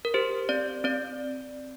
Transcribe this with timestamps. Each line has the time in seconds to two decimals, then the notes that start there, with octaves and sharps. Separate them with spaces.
0.05 A#4
0.14 G4 C5
0.49 C4 D5
0.84 C4 D5